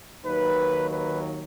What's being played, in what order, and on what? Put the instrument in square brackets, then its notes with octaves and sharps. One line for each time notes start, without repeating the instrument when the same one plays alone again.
[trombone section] D#2 D#3 F#3 B4
B4